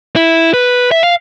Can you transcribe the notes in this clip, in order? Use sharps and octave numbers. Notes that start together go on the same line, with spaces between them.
E4
B4
E5
F5